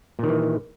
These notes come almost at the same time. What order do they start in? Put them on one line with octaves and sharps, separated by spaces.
A#2 D#3 E3